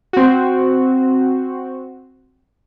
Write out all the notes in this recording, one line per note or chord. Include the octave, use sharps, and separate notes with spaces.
C4 F#4